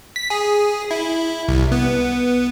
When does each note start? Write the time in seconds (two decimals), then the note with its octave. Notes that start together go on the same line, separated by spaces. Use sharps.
0.16 B6
0.30 G#4
0.91 E4
1.48 C2
1.72 B3